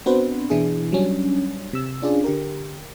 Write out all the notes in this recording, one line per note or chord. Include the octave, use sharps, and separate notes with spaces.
B3 C4 D4 F#4 B4 C5
B2 E3 D4 E4 G#4
F#3 G3 C#4 D4
C3 E6
C#4 D4 F4 G#4 D5
D3 G4 A#4